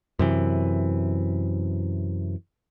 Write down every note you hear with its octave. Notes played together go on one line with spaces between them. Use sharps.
F#2 C3 E3